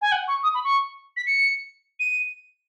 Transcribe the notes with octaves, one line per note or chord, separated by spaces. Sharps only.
G#5
F#5
C#6
D#6
B5
C#6
B6
C#7
D#7